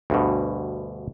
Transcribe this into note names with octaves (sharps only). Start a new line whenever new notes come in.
D2 G2 B2